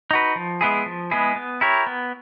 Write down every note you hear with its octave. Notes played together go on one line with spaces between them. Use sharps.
D#4 F#4 B4
F3
G#3 B3 E4 G#4
F3
G#3 B3 E4 G#4
B3
E4 G4 A#4 C#5
B3